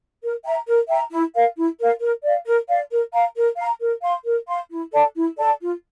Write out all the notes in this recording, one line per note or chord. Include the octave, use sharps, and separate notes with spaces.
A#4
E5 G5 A#5
A#4
E5 G5 A#5
E4
A#4 F5
E4
A#4 F5
A#4
D5 F5
A#4
D5 F5
A#4
F5 A#5
A#4
F5 A#5
A#4
F5 C6
A#4
F5 C6
E4
A4 D5 A5
E4
A4 D5 A5
F4